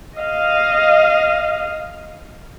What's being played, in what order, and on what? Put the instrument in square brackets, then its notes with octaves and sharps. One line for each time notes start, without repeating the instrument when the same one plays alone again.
[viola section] D#5 F5